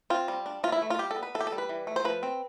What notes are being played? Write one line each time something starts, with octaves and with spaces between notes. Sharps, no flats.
C4 F4
G3
D4
E3 F4
E4
A3
F4
G3 G4
A4
B3
B4
E3 A4
G4
A4
G3
B4
E3
A3
C5
F3 B4
C4